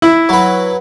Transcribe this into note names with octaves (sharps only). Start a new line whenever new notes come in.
E4
F#3 B4